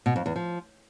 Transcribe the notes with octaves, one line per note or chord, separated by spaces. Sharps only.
B2
F2
E2
F3